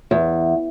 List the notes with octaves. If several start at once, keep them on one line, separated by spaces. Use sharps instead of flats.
E2